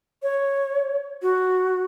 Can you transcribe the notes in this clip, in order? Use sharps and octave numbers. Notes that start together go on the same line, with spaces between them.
C#5
F#4